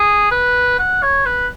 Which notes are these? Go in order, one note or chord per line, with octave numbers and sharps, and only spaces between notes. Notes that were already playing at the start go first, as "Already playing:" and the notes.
Already playing: G#4
B4
F#5
C#5
B4